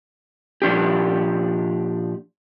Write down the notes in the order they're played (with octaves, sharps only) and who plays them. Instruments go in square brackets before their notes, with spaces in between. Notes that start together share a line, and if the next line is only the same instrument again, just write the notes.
[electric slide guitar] A#2 F3 D4 G4